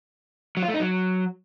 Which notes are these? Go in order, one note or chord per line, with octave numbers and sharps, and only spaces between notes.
F#3
F4
A3
D#4
F#3